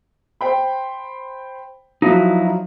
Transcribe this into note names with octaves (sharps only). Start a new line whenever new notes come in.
C5 G5 B5
F3 F#3 D#4 E4 F#4